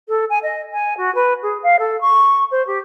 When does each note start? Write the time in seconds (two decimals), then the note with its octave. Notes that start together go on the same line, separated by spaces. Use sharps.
0.08 A4
0.29 G#5
0.43 D#5
0.72 G#5
0.97 F#4
1.15 B4
1.42 G#4
1.63 F5
1.79 A4
2.00 C#6
2.51 C5
2.66 G4